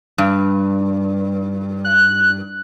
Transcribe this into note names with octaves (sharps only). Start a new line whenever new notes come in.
G2
F#6